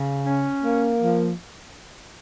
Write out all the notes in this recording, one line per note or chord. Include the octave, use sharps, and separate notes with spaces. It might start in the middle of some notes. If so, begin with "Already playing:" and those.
Already playing: C#3
C#4
A#3
F3